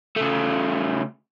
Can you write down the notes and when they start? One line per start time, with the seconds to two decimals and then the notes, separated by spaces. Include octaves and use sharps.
0.16 C#3 A3